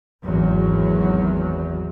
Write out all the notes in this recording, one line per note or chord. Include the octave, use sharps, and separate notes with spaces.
G#1 E2 F#3